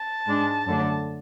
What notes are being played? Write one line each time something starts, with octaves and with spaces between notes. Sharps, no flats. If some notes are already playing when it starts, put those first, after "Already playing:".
Already playing: A5
G#2 G#3 D4
F#2 D3 A3 D4